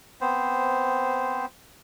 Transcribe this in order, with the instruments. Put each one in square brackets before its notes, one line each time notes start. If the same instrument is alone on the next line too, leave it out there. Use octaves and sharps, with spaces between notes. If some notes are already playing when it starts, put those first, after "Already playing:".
[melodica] B3 C4 C5